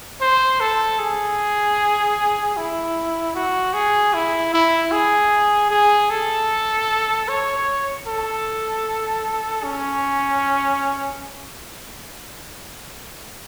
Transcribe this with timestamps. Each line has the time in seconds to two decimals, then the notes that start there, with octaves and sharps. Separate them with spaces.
0.21 C5
0.60 A4
0.99 G#4
2.57 E4
3.35 F#4
3.74 G#4
4.14 E4
4.53 E4
4.92 G#4
5.71 G#4
6.11 A4
7.28 C#5
8.07 A4
9.64 C#4